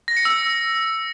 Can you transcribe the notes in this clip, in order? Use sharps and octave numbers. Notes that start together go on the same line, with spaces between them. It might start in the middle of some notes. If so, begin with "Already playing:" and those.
A#6
C#7
E6